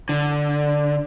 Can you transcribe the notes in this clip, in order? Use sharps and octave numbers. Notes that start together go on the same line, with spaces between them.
D3